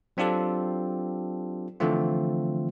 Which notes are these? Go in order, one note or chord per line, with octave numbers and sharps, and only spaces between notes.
F#3 C4 D4 F4 G4 A4
D3 E3 F3 A3 C4 F4